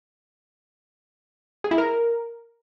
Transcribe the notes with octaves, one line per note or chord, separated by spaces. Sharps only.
G#4
E4
A#4